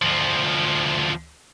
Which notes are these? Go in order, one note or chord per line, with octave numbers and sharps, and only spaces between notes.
D2 F3